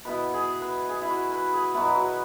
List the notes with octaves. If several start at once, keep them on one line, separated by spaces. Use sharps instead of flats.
B2 B3 E4 B4
G#4
B4
G#4
E4
F#4
B4
G#4
B2 F#3 B3 E4 B4
F#4